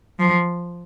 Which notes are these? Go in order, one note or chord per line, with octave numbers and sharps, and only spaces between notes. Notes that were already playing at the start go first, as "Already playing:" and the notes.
F3